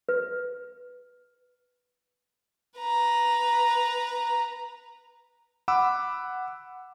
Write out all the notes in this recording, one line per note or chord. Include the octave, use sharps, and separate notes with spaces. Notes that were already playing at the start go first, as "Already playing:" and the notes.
B4
B4 A#5
F#5 B5 D6 E6